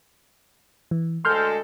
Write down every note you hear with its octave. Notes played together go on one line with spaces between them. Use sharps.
E3
D2 G#3 A4 C6 F6 G6